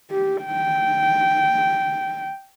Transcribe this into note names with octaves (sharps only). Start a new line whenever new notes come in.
G4
G5